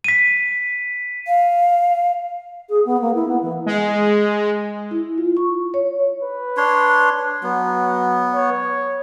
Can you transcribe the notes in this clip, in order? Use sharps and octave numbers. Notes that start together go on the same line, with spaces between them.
B6 D#7
F5
G#4
B3
A#3
E4
B3
E3
G#3
E4
F4
C#6
C#5
B4
D4 C#5 C6
F#3 B3
C#5